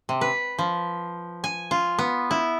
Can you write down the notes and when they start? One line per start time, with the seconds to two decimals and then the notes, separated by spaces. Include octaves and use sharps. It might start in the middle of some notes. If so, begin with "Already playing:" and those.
0.09 C3
0.21 B4
0.59 F3
1.44 G#5
1.71 F4
1.99 B3
2.31 E4